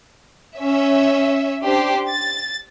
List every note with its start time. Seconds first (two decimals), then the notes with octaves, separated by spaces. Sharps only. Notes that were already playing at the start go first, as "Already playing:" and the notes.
0.58 C#4 E5
1.63 D4 G4 C5
2.10 A6